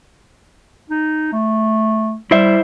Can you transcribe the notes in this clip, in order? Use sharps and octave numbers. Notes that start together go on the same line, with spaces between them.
D#4
A3
G3 E4 C5 E5